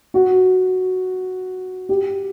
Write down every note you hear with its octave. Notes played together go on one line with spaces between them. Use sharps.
F#4
G4